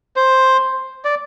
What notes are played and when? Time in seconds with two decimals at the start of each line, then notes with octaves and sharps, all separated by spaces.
0.16 C5
1.05 D5